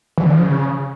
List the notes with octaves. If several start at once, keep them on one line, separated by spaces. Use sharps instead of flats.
E3
D3
F3
C#3